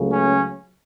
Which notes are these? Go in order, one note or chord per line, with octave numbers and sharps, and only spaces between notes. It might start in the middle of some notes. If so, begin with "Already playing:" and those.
Already playing: C#2 C#3 F#3 A3
C#4